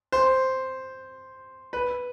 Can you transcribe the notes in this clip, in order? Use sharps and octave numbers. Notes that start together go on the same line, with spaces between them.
C5
B4